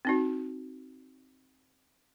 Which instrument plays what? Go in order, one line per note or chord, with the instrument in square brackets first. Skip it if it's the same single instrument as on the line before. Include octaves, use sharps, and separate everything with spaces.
[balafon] C4 D#4 F#4